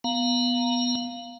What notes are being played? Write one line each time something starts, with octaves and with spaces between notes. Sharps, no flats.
B3 F5 A#5